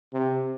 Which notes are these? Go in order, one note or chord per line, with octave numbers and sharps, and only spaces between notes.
C3